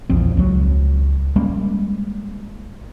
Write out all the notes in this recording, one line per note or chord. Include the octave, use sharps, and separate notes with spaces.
A#1 E2 F3 C4
C#2 F#3
G3 G#3 A#3 C#4